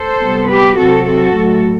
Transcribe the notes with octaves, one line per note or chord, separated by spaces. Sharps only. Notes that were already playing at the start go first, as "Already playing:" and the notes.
Already playing: A4 C5
C3 G3 B3
G4 B4
C3 F#3 C4 F#4 A4
F#4 A4
A2 F#3 A3